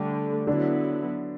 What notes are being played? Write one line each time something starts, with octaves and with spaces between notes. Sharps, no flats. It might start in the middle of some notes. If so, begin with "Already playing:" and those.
Already playing: D3 G3 A3 D4 G4
D3 F#3 B3 D4 E4